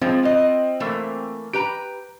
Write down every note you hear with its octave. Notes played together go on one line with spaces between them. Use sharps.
F3 G#3 C4
F4 D#5
E3 A3 A#3
G4 B4 A#5 D7